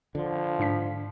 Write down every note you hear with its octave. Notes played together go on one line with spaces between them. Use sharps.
D3 F3
G#2 D4 B6